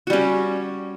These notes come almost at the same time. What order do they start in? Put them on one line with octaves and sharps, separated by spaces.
F#4 G3 C#4